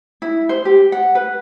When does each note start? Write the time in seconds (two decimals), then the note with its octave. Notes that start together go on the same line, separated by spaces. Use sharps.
0.22 E4
0.49 C5
0.65 G4
0.92 F#5
1.15 B4